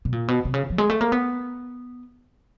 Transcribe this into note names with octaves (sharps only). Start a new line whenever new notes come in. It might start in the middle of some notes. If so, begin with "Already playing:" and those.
B2
A#2
B2
C3
C#3
F3
G#3
A3
A#3
B3